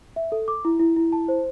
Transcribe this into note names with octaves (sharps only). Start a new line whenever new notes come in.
E5
A4
D6
E4
E4
E4
A5
C5